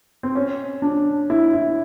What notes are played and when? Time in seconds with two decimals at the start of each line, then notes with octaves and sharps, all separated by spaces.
0.23 C4
0.35 C#4
0.82 D4
1.30 E4
1.53 E4